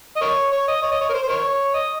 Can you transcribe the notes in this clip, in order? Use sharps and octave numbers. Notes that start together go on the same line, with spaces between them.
D#5
A#4 C#5
C#5
D#5
C#5
D#5
C#5
A#4
C5
C5
A#4 C#5
D#5